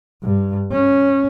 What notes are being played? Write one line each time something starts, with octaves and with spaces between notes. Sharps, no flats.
G2
C#4